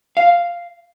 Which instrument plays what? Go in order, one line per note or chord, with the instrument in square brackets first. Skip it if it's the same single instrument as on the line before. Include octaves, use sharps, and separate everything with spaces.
[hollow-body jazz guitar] F5